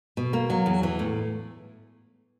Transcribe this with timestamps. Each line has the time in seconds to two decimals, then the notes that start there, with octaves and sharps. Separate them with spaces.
0.17 B2
0.33 A#3
0.50 F#3
0.66 E2
0.83 E3
0.99 A2